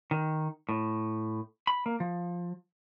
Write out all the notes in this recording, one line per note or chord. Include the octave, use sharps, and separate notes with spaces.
D#3
A2
B5
A#3
F3